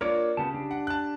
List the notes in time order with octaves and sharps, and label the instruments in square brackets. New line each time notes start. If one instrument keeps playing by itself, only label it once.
[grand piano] A#3 D4 F4 [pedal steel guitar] A#4 C#5 D6
[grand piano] C#3 [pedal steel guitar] B3 G4 A5
[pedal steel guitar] D4 G4
[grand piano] F#5
A5 F#6